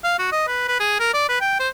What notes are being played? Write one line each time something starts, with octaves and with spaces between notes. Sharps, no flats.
F5
F#4
D#5
B4
B4
G#4
A#4
D5
B4
G5
C5